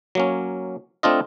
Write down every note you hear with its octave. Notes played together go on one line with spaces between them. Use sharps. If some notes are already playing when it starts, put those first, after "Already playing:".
F#3 A#3 C#4
A3 C4 D4 F4 D#5